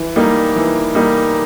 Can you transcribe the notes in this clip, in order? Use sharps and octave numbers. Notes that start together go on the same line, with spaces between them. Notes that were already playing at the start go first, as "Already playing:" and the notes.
Already playing: E3
G3 A#3 D#4
E3
G3 A#3 D#4